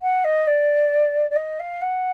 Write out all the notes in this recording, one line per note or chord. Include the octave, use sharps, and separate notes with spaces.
F#5
D#5
D5
D5
D#5
F5
F#5